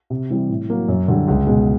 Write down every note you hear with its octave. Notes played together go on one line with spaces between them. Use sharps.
C3
E3 G3 C4
A2
F#3 A#3
F#2
D3 G3
C#2
B2 G#3